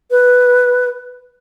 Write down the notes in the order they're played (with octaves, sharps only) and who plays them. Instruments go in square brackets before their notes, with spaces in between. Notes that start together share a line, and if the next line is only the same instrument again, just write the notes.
[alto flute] B4